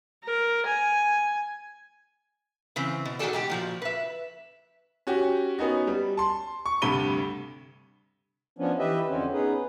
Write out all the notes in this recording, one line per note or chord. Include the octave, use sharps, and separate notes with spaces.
A#4
G#5
C#3 E3 C4
B2
D#3 A3 F#4 G#4 A4 D5
G#2 B2 G4
A#2 F3 F#4
B4 E5
C#4 F#4 G4
B3 C#4 D#4 F#4
G3
A5 C6
C#6
D2 G2 C3 B5 D#7 G7
F3 B3 C#4 D4
E3 G4 B4 D#5 E5
F2 D3 C4 C#4
B3 C#4 D#4 G#4 B4